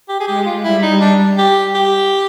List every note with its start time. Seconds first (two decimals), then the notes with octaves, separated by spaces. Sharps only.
0.09 G4
0.20 G#4
0.27 G#3 G4
0.46 F4
0.64 G3 E4
0.82 D#4
1.01 D4
1.38 G4
1.75 G4